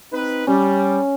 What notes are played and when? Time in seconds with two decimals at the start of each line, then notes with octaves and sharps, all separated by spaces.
0.13 C4 D#4 B4
0.47 G3 C#4